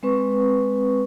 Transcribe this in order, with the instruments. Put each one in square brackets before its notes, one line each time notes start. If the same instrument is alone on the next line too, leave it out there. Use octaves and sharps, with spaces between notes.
[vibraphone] G#3 C4 B4 C#6